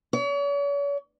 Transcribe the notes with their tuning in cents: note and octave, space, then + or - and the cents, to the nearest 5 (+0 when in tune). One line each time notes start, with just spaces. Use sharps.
C#5 +40